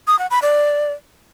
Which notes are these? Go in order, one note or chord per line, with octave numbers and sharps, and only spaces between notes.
D#6
F#5
B5
D5